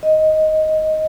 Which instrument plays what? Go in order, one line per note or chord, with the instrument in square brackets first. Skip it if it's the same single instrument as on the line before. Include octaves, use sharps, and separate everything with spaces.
[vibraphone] D#5